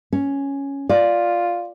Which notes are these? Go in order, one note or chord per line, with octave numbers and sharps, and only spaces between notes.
C#4
F4 D5